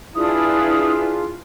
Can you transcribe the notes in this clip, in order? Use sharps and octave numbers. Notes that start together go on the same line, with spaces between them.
D4 E4 F4 G#4 B4 D#6